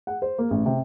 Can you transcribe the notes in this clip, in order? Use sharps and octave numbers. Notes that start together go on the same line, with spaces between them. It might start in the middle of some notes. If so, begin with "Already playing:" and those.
F#5
C5
A#3
A1
C3